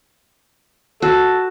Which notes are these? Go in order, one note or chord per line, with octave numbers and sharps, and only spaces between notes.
F#4 A4